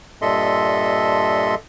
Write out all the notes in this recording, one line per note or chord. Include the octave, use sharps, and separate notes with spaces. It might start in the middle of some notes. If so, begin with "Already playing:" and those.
G2 A#2 A4 D#5 E5 C6